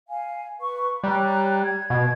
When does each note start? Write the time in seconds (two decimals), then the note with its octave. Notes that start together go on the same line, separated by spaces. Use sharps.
0.08 F5 G#5
0.61 B4 C#6
1.03 G3 C#5 A#5 F#6
1.62 G#6
1.90 B2